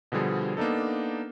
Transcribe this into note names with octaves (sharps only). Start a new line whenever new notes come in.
B2 D3 F3 G3 G#4
A#3 B3 D4 D#4 A4